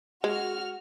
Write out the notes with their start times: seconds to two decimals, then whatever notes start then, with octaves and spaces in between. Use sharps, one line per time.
0.24 G#3 F#4 F6